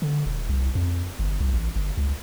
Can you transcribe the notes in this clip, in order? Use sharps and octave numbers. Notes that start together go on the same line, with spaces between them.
D3
D#1
C2
F2
G1
C2
A1
G1
C#2